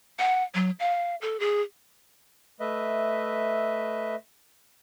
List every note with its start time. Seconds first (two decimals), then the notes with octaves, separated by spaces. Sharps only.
0.19 F#5
0.55 F#3
0.80 F5
1.22 A4
1.40 G#4
2.60 A3 B4 D#5 E5